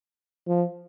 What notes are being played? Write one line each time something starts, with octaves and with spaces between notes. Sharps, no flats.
F3